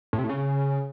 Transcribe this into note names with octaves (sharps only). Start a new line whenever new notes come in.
A2
C3
A2
C#3